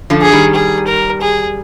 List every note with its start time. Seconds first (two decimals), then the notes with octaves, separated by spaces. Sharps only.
0.10 D3 F3
0.22 G#4
0.32 D#3 G3
0.55 G#4
0.87 A#4
1.21 G#4